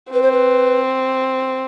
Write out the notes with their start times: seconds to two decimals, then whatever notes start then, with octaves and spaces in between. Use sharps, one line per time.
0.12 C4 B4
0.22 C5
0.32 B4